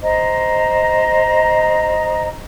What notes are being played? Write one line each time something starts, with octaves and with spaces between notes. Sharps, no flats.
C5 D#5 A#5